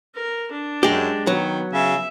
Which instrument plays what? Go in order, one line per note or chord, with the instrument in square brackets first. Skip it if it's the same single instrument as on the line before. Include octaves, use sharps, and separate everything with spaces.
[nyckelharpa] A#4
D4
[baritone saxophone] F#2 [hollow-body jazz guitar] G#3 G4
[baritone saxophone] D#3 [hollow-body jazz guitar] F#3 [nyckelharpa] B3
[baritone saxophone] C#3 [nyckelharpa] E5